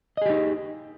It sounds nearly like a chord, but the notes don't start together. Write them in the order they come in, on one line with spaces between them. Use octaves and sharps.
D#5 G#4 G4 D#4